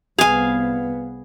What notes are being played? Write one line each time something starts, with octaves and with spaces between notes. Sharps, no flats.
C2 B3 G#4 F5 G#5